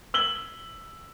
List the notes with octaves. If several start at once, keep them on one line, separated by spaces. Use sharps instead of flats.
E6 F#7 G7